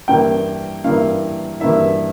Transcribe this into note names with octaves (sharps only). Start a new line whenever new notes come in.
G2 E3 A#3 E4 G5
G2 E3 A#3 E4 F5
G2 E3 A#3 E4 E5